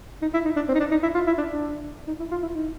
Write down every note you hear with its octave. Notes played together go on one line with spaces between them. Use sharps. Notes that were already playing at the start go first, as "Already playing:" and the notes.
D#4
E4
D#4
D4
C4
D#4
D4
D#4
E4
F4
E4
D4
D4
D#4
E4
F4
E4
D#4